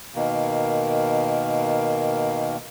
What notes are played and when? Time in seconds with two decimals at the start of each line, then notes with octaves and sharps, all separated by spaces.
0.15 B2 D#3 A#3